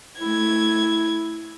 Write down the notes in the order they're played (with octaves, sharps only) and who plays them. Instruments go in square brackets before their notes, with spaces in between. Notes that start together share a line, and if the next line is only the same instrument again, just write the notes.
[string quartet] A3 G#6 [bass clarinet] E4